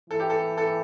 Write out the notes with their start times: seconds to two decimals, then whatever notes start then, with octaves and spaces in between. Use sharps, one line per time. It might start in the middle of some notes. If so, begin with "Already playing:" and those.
0.10 E3 A4
0.20 G4
0.30 A4
0.58 A4